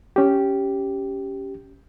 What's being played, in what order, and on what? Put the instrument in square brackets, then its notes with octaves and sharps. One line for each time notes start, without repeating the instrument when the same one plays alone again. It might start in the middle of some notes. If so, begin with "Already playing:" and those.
[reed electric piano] C#4 G4